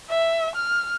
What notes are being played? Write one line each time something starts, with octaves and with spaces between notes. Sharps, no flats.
E5
F6